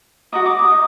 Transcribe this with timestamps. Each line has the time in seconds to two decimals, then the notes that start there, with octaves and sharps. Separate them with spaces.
0.32 F#4 A#4 D#5 D#6
0.46 D6
0.59 D#6
0.71 D#4